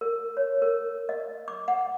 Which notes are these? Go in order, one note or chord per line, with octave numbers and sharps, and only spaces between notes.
A#4
C#5
A#4
D#5
D6
F#5